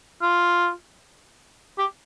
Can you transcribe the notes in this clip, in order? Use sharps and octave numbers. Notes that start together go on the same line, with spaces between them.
F4
G4